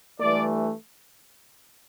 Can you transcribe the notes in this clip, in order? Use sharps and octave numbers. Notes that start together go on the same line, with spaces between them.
G2 E3 A3 D5